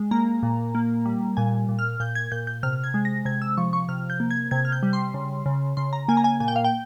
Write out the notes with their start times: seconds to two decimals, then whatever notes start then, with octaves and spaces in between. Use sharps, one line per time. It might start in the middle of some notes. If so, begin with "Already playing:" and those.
Already playing: G#3
0.11 A#3 A#5
0.43 A#2
0.75 A#3
1.05 G3
1.37 A#2 G#5
1.69 A#2
1.79 F6
2.00 A#2 G6
2.15 G#6
2.32 A#2 G6
2.47 G6
2.63 C3 F6
2.84 G#6
2.94 G#3
3.05 A#6
3.25 C3 G#6
3.42 E6
3.57 F3 C#6
3.73 C#6
3.89 C3 F6
4.10 G6
4.20 A#3
4.31 G#6
4.51 C3 G#6
4.65 F6
4.72 G6
4.83 G3
4.93 C6
5.14 C#3
5.46 C#3
5.77 C#3 C6
5.93 A#5
6.08 A#3 G#5
6.17 A#5
6.24 G#5
6.40 A#2 G#5
6.48 G5
6.56 F5
6.64 G5